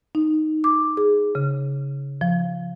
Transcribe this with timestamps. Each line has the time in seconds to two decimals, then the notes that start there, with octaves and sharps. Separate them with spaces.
0.15 D#4
0.64 D6
0.97 G#4
1.35 C#3
2.21 F3